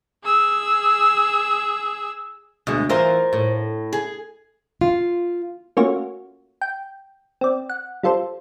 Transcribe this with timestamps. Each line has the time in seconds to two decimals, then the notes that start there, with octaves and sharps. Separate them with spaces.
0.24 G#4 E6
2.67 D2 B2 G#3
2.89 E3 F4 A#4 C5
3.33 A2
3.93 G#4
4.81 F4
5.77 A3 A#3 C#4 F4 F#4 C#5
6.61 G5
7.41 C4 D5
7.70 F#5
8.03 G3 F4 A4 C5